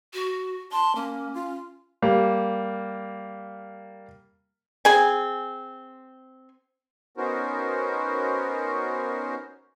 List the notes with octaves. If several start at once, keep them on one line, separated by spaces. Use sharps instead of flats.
F#4
A5 C6
A#3 C#4
F4
G3 A#3
C4 G#4 G#5
B3 C#4 D#4 F#4 A#4 C5